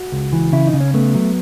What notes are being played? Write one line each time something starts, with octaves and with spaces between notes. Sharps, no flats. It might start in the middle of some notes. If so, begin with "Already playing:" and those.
Already playing: F#4
C#2
E3
C#3 E4
D#4
C#3
C#4
A3 B3
F#3